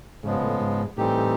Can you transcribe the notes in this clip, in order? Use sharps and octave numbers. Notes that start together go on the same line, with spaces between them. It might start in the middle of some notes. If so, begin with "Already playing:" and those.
G#2 C#3 F3 G#3 B3
A2
G#2
A2 E3 G3 C4 D#4 G4